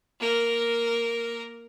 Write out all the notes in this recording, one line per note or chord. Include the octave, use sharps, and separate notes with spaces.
A#3 A#4